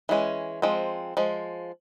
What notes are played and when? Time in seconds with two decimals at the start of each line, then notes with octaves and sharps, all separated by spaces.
0.09 E3 G#3 C#4
0.62 F3 G#3 C4
1.17 F3 G#3